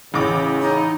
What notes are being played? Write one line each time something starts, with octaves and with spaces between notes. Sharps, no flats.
A1 C#3 B5 D6
D#4